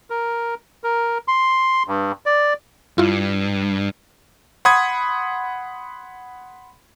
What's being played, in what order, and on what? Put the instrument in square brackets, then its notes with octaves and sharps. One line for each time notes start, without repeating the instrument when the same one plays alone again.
[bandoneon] A#4
A#4
C6
G2
D5
[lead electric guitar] G2 [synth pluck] E4 F4
[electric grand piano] F#5 B5 C6 D#6 G#6